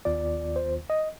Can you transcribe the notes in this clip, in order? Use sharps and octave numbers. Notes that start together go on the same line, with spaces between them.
D#2 D#3 B3 F4 D5
C5
D#5